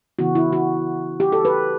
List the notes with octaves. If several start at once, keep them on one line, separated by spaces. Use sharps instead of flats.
C#3 E3 B3 E4 F#4
E4
F#4
G4
A4
B4